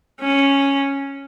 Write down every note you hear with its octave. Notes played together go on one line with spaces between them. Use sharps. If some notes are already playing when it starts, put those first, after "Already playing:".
C#4